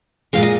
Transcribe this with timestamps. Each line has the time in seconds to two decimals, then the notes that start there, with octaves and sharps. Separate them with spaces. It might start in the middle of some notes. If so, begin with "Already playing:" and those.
0.33 A#2 F3 G#3 F5
0.43 D#5